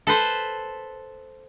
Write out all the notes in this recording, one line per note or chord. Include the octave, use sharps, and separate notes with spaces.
A4 B4 C5